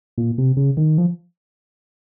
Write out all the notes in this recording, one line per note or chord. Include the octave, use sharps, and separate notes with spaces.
A#2
C3
C#3
D#3
F3